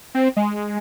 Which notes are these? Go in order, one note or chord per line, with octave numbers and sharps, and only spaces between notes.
C4
G#3